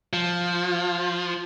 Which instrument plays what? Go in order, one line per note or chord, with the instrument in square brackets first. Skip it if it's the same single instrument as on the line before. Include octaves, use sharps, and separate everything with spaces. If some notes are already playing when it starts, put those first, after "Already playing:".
[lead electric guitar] F3